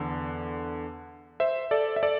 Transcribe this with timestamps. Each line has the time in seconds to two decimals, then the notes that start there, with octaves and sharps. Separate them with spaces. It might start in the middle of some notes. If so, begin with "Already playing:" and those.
Already playing: E2 D3
1.40 C5 E5
1.71 A4 D5
1.96 E5
2.03 A4 D5